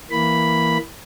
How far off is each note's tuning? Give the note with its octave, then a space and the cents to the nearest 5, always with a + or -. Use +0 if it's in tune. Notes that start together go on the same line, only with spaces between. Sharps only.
E3 +0 A#3 +0 B5 +0